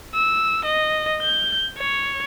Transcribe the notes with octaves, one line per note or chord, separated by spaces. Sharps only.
E6
D#5
G6
C#5